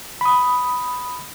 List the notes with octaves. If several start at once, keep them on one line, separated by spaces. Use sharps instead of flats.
B5 D#6